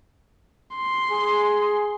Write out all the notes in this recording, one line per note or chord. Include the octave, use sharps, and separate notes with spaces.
C6
G#4